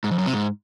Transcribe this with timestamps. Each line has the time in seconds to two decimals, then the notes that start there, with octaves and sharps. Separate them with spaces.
0.04 G#2
0.11 F2
0.19 F#2
0.26 C3
0.34 G#2